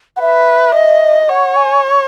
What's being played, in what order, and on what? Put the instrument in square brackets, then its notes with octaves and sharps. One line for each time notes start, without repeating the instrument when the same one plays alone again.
[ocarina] F#5
[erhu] B4 [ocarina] E5
[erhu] D#5
[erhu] C#5 [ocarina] F#5
[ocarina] G#5